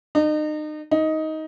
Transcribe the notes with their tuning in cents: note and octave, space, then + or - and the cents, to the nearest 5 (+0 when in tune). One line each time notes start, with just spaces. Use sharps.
D#4 -35
D#4 +15